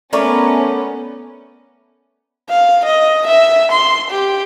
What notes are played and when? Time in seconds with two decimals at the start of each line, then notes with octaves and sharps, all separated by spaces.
0.13 A3 B3 C#4 A#4 D5
2.50 F5
2.85 D#5
3.27 E5
3.72 C6
4.11 G4